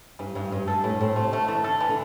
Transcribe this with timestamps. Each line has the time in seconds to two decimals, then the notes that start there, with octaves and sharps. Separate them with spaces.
0.19 G2 E3
0.35 G2 E3
0.52 G2 E3
0.68 G2 A4
0.84 A2 E3
1.01 A2 C4
1.16 C3 A3
1.33 D3 A3
1.48 E3 A3
1.64 D3 A4
1.81 E3
1.89 D3